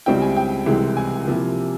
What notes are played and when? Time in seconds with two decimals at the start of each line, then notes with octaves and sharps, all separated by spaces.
0.06 C#2 C#3 G3 C4 E4 G5
0.22 G#5
0.36 G5
0.66 C2 C3 E3 G#3
0.97 G#5
1.27 C3 F3 A#3 E4